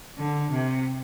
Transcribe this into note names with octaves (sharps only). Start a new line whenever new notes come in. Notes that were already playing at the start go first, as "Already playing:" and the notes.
D3
C3